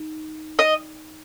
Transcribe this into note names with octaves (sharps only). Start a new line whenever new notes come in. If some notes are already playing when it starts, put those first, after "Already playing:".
Already playing: D#4
D#5